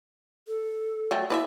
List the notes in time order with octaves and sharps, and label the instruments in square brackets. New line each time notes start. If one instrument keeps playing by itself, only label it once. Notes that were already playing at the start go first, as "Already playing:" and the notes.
[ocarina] A4
[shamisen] F#3 A3 G5
[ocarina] E4 [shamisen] B4 D5 E5